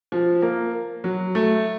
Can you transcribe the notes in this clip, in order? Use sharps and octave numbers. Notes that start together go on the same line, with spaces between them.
F3
A#3
F#3
A3